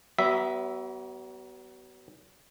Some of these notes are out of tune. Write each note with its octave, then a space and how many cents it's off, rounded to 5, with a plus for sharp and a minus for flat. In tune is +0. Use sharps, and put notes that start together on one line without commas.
F#3 +40 B3 +0 E5 +0